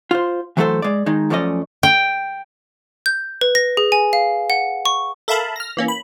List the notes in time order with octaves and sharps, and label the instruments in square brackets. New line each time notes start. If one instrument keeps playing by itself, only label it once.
[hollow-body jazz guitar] F4 C5
E3 F#3 A3 G#4 A4 C5
G#3 D5
D#3 G#3 D#4
F#2 F3 A3 C#4 D5 D#5
[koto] G5
[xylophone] G6
B4
A#6
G#4
G#5
F5
F#5
C#6
[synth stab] A4 A#4 E5 F5 A5 B5
F6 A#6
E3 A#3 C#4
B5